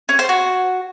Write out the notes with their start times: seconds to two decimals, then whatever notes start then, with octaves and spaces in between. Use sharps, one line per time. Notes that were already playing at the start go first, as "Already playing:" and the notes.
0.09 C#4
0.19 C5
0.29 F#4